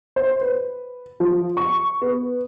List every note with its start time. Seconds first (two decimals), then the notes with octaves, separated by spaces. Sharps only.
0.16 C5
0.41 B4
1.20 F3
1.57 C#6
2.02 B3